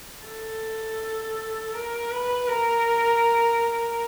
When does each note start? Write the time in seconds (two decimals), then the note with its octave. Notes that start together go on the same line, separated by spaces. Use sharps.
0.25 A4
1.73 A#4
2.11 B4
2.48 A#4